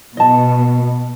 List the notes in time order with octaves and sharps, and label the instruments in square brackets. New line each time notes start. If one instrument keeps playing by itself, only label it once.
[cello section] B2 [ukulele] D#5 A5